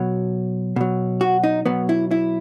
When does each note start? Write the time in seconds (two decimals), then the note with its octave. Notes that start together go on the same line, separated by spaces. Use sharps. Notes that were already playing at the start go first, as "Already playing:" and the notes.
Already playing: B2 F#3
0.76 B2 F#3
1.21 F#4
1.44 D#4
1.66 B2 F#3 B3
1.89 E4
2.11 E4